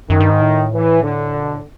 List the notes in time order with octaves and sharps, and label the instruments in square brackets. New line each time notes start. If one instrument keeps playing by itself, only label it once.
[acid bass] F#2 [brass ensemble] D#3
[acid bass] G2
G#2
A2
[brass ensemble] E3
D3
[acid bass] A#2
B2
A2